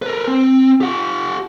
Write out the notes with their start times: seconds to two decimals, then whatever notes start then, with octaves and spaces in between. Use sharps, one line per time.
0.02 A#4 B4
0.28 C4
0.81 G4 F#5